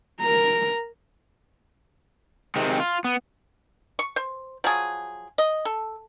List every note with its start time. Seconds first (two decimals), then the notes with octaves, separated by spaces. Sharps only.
0.21 A#4 A#5
2.56 C3 D#3 G#3 C4
2.80 F4
3.04 B3
3.99 C#6
4.16 C5
4.64 F3 F#3 G#4
5.38 D#5
5.65 A4